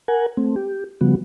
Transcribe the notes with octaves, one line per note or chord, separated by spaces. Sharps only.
A#4 F#5 G#5
A3 C4
G4
C#3 F3 G3 B3 F#4